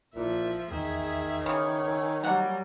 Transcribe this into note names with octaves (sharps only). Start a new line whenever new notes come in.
A1 A#2 F3 E4 A#4 E5
A1 E2 D#3 G#4 E5
C#3 E3 C#5 D#6 F6
A#4 G#5 E6
F#3 G3 A#3 F#5